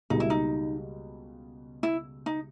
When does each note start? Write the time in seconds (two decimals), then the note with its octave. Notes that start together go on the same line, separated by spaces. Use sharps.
0.10 C#2 B2 G3 A#3 D#4
0.20 E4
0.30 D#4
1.83 E4
2.26 D#4